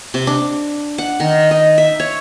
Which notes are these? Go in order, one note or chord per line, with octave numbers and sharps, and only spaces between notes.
C3
D4
F#5
D#3
D#5
E5
C#5